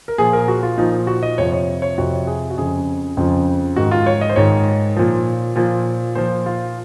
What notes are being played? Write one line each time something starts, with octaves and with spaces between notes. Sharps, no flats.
A#4
A#2 F3 G#4
A#4
F#4
F4
A#2 F3 D#4
F#4
D#5
F2 C3 F3 C#5
C#5
C#5
F2 C3 F3 F#4
G#4
F#4
F2 C#3 F3 G#4
F2 C#3 F3
G#2 D#3 F#4
F4
C#5
D#5
C5
G#2 D#3 C#5
A#2 F3
A#2 F3
A#2 F3 C5
F4